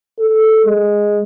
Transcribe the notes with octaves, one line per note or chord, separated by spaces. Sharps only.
A4
G#3